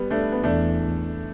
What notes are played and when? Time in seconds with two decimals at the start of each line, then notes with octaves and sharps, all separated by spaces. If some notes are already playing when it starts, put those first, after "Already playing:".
Already playing: G3 B3
0.10 A3 D4
0.32 B3
0.43 E2 A3 D4